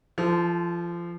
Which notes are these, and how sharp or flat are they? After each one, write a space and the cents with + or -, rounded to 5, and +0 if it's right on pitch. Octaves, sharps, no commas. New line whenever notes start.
F3 -25 A4 +0